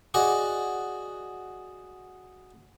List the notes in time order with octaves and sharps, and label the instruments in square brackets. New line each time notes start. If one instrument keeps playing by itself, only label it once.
[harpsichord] F#4 G#4 D5 D#5